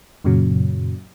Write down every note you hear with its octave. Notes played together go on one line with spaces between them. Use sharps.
F#2 A#2 C#3 F#3